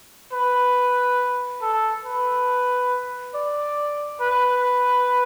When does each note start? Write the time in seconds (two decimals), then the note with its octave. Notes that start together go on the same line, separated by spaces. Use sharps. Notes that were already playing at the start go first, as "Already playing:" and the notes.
0.32 B4
1.62 A4
2.05 B4
3.35 D5
4.21 B4